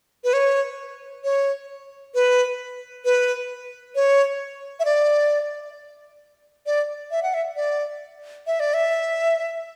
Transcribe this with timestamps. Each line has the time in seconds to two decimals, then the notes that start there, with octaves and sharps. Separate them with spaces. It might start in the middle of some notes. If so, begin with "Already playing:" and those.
0.24 B4
0.33 C#5
1.24 C#5
2.15 B4
3.05 B4
3.95 C#5
4.80 E5
4.85 D5
6.66 D5
7.11 E5
7.23 F#5
7.34 E5
7.56 D5
8.47 E5
8.60 D5
8.74 E5